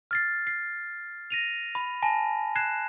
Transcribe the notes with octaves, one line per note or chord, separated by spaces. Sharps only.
F6 A6 C7
C7
A#6 D#7 F7
B5
G#5 A5 A#6
F#6 G#6 C7 E7